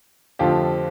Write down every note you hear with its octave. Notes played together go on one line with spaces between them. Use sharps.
F2 D3 F3 A3 C4 F4 G4